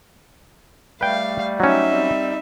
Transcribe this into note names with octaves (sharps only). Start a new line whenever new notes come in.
G3 A3 B4 F5 G5
F#3 C#4 D#4 E5
G3 C4